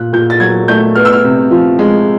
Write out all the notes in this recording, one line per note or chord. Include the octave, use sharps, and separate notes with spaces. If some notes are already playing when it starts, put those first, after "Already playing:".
Already playing: A#2 F#6
A#2 G6
A6
F#3 G#6
A3 G6
B3 F6
E6
F6
C3
F3
G#3